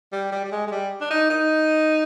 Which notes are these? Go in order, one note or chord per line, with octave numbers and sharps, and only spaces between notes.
G3
G3
G3
G#3
G#3
G3
D4
D#4
D#4